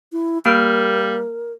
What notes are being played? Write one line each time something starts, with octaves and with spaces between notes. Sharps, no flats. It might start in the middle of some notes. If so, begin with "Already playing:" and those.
E4
G3 A#3 A#4 F6